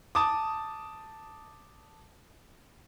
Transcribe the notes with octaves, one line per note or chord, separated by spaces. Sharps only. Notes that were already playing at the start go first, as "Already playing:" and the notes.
A5 D6 D#6